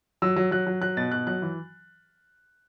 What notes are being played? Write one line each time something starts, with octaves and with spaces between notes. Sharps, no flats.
F#3 E6
F#3
F#3 F#6
F#3
F#3 F#6
B2 A6
B2 F#6
F#3 F#6
E3